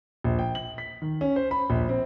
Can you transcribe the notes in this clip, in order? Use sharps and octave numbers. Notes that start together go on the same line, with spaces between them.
A#1
G5
F#7
B6
D#3
C#4
C5
B5
A#1
C4